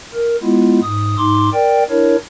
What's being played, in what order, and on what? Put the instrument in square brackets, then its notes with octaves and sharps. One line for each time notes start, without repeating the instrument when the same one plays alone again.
[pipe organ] A#4
G#3 B3 E4 F4
G#2 D#6
G#2 D#4 C6 D6
A#4 D5 G5
D4 E4 A#4 C#5